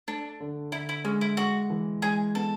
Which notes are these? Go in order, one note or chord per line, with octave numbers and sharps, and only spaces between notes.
A3 D4
D3
D3 E4
E4
G#3 C#4
E4
G#3 F#4
E3
G#3 G#4
B3 A4